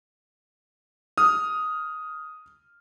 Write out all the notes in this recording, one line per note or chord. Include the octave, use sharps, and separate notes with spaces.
D#6 F6